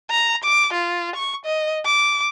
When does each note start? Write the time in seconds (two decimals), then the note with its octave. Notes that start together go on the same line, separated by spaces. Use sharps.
0.11 A#5
0.44 D6
0.73 F4
1.16 C#6
1.45 D#5
1.85 D6